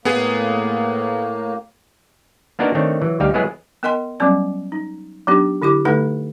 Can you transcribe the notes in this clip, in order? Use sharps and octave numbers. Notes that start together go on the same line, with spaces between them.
A2 A#3 B3 G#4
A#3 B3 D4 D#4 F#4 A#4
D#3 A3 C4 D4 C#5
E3 F#3
D2 G3 D#4 G4 F5
F#3 G#3 B3 E4 G#4
B3 A#4 D#5 G#5 C6
F#3 G3 B3 C#4 D5
D#4
F#3 B3 D4 D#4 G4
D3 E4 G4 D6
D3 A3 D#4 A4 B4 F#5